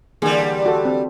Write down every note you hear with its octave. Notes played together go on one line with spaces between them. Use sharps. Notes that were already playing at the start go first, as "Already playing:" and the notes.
D3 E3 G3 A#3 G#4
F#4 A4
C4